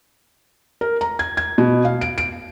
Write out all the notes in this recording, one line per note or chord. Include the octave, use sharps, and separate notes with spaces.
A#4
A#5
G#6
G#6
B2
F5
D7
D7